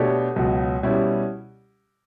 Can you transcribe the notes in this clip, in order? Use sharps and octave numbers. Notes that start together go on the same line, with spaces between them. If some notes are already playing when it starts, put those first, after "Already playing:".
Already playing: B2 A3 D4 G4 C#5
C#2 B2 F#3
B2 G3 C#4 E4 G4